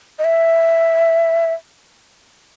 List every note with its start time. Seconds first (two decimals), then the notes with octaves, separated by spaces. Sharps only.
0.19 D#5
0.24 E5